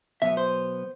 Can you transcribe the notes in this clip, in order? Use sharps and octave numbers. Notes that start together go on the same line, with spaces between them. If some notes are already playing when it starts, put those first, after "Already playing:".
B2 F#3 B3 E5
C5